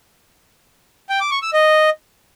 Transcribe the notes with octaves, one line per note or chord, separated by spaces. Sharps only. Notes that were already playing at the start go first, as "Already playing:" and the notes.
G5
D6
C#6
E6
D#5